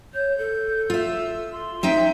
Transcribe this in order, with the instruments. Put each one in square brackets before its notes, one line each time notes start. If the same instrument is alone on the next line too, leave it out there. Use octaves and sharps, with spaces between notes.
[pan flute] C#5 [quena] G6
[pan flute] A4
[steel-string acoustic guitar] F4 E5 [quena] E6
[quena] C6
[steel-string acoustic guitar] C4 D#4 G5 [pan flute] E5